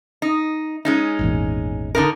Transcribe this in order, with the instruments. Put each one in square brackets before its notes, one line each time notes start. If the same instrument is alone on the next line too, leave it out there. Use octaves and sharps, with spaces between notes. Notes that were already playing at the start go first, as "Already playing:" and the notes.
[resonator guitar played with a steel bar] D#4
G#3 C#4 D#4
[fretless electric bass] G#1 E2 A#2
[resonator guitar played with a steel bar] D3 D#4 A#4